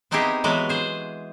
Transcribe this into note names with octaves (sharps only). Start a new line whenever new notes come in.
B3 C4 D#4 E4 G4 G#4
E3 F#3 G#3 B3 F#4
G#4 C5